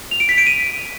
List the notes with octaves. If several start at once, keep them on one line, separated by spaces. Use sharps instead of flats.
F7
D7
B6
D7
D#7